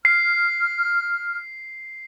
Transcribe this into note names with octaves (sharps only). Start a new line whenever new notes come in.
F6 C7